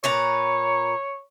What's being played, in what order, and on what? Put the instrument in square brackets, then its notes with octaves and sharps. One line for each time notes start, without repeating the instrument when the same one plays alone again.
[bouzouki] A#2 B4 A#5 [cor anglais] C#5